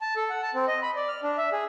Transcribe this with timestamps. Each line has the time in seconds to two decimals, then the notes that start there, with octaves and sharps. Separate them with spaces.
0.01 A5
0.16 A4
0.30 F#5
0.42 A5
0.54 C4
0.68 D#5
0.82 B5
0.96 D5
1.09 F6
1.23 D4
1.37 E5
1.52 G#4